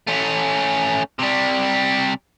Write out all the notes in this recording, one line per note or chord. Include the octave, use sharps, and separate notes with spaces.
A3 C#4
C3 G3